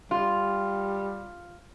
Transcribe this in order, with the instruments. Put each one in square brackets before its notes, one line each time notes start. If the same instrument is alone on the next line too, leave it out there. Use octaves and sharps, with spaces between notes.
[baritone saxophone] G3 [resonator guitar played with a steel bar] F4